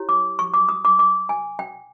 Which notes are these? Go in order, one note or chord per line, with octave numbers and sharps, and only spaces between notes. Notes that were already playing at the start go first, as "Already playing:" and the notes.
Already playing: E4 G4 C#5
D6
C#6
D6
D#6
D6
D6
G#5
G5